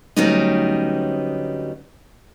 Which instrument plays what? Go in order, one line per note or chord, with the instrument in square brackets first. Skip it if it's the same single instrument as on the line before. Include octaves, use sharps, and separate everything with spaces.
[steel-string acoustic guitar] D2 F#3 G3 B3 C#4 D#4